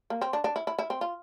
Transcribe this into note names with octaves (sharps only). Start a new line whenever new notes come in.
A#3
C4
D4
D4
E4
E4
E4
C4
F4